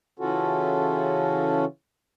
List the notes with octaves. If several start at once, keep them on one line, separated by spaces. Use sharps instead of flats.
C#3 E3 C#4 F4 F#4 A4